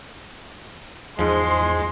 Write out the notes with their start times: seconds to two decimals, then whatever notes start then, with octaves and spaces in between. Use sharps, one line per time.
1.19 E2 G#2 F3 G#3 C6